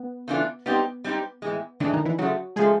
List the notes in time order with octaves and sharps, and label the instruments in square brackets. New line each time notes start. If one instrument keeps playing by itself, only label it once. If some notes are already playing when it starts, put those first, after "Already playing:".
Already playing: [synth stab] B3
[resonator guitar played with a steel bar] C#3 E3 A3 D4 F4
[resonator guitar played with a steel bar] G3 C4 D#4 G4 [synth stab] B3
[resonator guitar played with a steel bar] G3 C4 D#4 G4
A2 E3 G#3
[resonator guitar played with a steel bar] A2 E3 G#3 [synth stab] D3 D4
[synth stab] D#3 D#4
E3 E4
[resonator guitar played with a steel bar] C#3 F3 A3 [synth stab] F#3 F#4
[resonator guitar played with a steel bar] C#3 F3 A3 [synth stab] G#3 G#4